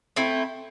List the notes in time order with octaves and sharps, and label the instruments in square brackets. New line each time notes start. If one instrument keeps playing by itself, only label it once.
[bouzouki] A3 C4 E4